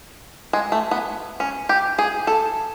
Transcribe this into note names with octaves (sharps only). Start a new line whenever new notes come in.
G#3
A3
B3
C#4
G4
G#4
A4